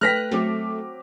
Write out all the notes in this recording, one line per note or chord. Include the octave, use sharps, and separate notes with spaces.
A3 B4 G5 F6 F#6 A#6 B6
F#3 A3 C4 D6